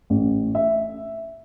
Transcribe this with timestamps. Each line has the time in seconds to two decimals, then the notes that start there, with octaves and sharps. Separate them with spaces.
0.10 A1
0.55 E5